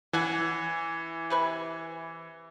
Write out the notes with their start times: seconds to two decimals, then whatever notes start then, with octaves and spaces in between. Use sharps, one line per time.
0.13 E3 C#4 F#5 G#5
1.30 C3 B4 G#5